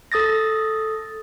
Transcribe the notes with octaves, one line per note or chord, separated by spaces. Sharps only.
A4 D#6 A6 A#6